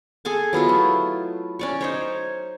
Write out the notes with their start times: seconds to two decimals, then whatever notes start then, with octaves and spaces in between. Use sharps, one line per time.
0.25 G#4 A4 G#5 A5
0.53 F#3 B3 E4 F4
0.69 A3
1.59 C#4 D5 C#6
1.81 D#4 C5 C#5